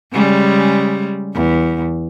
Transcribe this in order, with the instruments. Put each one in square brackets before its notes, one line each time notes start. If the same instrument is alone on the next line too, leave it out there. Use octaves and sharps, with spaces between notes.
[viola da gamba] C#3 G3 G#3
E2